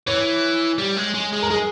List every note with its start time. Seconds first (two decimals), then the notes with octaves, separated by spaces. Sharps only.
0.07 E3 C#5
0.78 G3
0.97 G#3
1.14 G#3
1.33 G#3
1.43 A#4
1.50 G#3 G#4